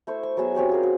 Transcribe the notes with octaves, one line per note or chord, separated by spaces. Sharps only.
A3 E4 C5 C#6
C#6
F#3 B3 G#4 E5
C4 C#4 G4 D5
F4 G#4 A#4
F#4